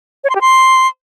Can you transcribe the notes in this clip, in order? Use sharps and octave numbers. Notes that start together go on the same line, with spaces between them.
C#5
C6
G4
C6